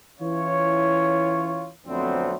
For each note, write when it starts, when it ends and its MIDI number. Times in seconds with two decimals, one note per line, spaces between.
0.20 1.70 52
0.20 1.70 61
0.20 1.70 64
0.20 1.70 65
0.20 1.70 73
1.87 2.34 41
1.87 2.34 50
1.87 2.34 54
1.87 2.34 57
1.87 2.34 59
1.87 2.34 60